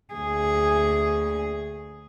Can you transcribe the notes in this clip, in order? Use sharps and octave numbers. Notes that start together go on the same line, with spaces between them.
D2 G#4